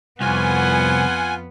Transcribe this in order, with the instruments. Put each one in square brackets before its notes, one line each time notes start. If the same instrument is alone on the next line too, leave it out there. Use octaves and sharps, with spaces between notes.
[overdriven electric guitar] C2 [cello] F2 B3 [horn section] F4 F#5 [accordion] G#5